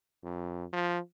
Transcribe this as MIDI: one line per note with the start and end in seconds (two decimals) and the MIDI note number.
0.24 0.65 41
0.73 0.98 53